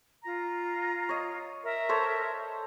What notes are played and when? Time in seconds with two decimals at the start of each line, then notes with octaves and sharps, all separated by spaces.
0.23 F4 A#5
1.09 C#5 D#5
1.63 A#4 E5
1.89 A4 C5 C#5